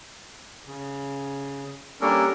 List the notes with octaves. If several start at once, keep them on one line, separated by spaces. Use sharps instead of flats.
C#3
G3 A#3 C#4 D4 A4 A#4